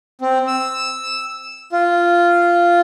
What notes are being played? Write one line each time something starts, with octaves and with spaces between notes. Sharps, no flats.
C4
E6
F4